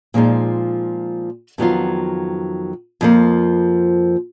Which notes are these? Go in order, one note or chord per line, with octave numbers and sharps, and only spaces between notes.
A#2 F3 G#3 D#4
F2 D#3 F#3 B3 F4
F2 F3 A#3